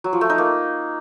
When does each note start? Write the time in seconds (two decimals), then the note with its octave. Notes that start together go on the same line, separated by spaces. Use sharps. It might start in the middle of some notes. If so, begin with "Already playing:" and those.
0.04 F#3
0.13 F3
0.21 A3
0.30 D#4
0.38 A#3